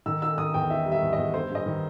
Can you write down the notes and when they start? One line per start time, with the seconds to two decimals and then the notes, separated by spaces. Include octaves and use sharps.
0.06 D#3 E6
0.22 D#4 E6
0.37 D#3 D#6
0.54 E2 G5
0.70 D#4 E5
0.86 G3
0.92 E5
1.02 E2
1.13 E2 D#5
1.34 G2 C5
1.50 G2
1.55 D#5
1.66 D#3